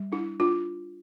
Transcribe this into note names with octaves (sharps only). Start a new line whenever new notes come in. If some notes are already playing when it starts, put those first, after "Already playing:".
Already playing: G3
D4 E4
D4 F4